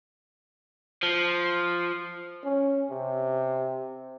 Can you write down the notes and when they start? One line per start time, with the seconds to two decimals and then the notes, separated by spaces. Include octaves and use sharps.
1.03 F3
2.44 C#4
2.90 C3